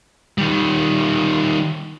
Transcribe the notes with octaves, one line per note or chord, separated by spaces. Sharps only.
D#3 G3